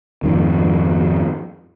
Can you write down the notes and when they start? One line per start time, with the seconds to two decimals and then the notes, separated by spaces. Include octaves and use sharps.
0.23 F2 G#2 D#3